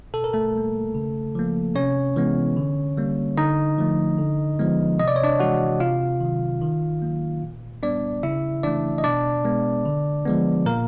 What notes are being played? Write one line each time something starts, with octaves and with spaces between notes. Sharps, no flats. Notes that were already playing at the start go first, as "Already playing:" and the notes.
B2 A4
A#4
A3 A4
G3 A#3
C#3
F3 A#3
C3 C#4 C#5
E3 G#3 B3
D3
G3 A#3
D3 D#4 D#5
F3 A3
D3
F3 G#3 B3
C3 D#5
D5
C#5
D4 D5
E3 G#3 F#4 F#5
C3 F4 F5
D#3 F#3
D#3
F#3 A#3
A#2
G3 B3 D4 D5
C#3 E4 E5
E3 A3 D4 D5
D#5
B2 D4 D5
G#3 B3
D3
F3 G#3 B3
A#2 A#3 A#4